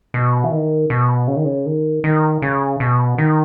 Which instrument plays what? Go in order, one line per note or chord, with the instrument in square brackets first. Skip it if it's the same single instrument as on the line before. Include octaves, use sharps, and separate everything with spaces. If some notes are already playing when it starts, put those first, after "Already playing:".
[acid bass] B2
E3
D#3
B2
C#3
D#3
C#3
D#3
D#3
C#3
B2
D#3